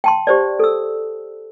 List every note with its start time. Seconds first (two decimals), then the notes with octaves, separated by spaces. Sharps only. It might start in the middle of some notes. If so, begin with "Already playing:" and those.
0.04 G5 A5 C6
0.27 G4 C5 D5
0.59 A4 E6